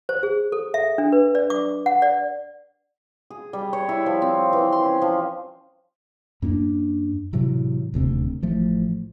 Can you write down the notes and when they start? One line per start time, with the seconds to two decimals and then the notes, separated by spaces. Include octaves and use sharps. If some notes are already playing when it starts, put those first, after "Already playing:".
0.09 C5
0.23 G#4
0.52 A4
0.74 E5
0.98 D4
1.12 B4
1.35 D5
1.50 D6
1.86 F#5
2.02 D5
3.30 G#4
3.53 G3
3.73 C#5
3.89 E4
4.06 F3
4.22 C4
4.53 E3
4.72 C6
4.85 C#4
5.02 F3
6.42 F#2 A#3 C#4 D4
7.33 A2 C3 E3 F#3
7.94 D#1 D2 C3 C4
8.42 A1 F3 A3